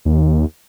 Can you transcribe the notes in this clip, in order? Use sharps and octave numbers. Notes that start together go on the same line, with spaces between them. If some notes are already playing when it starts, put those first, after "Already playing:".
D#2